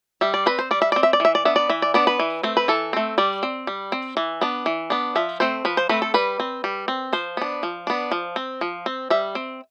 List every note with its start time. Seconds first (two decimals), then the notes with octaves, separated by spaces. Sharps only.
0.21 G3 E5
0.34 D5
0.46 C4 B4
0.59 C5
0.71 G3 D5
0.82 E5
0.92 C4 D5
1.03 E5
1.13 D5
1.20 E3 E5
1.35 D5
1.45 B3 D4 E5
1.56 D5
1.69 E3 E5
1.82 D5
1.94 B3 D4 D5
2.07 B4
2.19 E3
2.43 A3 C4
2.57 B4
2.68 E3 A4
2.93 A3 C4
3.18 G3 D5
3.43 C4
3.67 G3
3.92 C4
4.17 E3
4.41 B3 D4
4.66 E3
4.90 B3 D4
5.16 F3 E5
5.40 A3 C4 C5
5.65 F3 B4
5.77 C5
5.89 A3 C4 B4
6.02 A4
6.14 G3 B4
6.40 C4
6.64 G3
6.88 C4
7.13 F3 C5
7.37 B3 D4
7.63 F3
7.87 B3 D4
8.11 F3
8.36 C4
8.61 F3
8.86 C4
9.10 G3 E5
9.35 C4